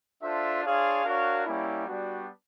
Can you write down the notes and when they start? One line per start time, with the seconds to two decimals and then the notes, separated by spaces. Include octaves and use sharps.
0.23 D4 F4 A4 C5 E5
0.63 D4 F4 G#4 C#5 F5
1.04 D4 F#4 A#4 C#5 F5
1.46 G3 A#3 C#4 E4
1.86 G3 B3 D4 F#4